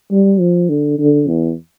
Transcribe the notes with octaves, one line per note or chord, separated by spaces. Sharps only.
G3
F3
D3
D3
E2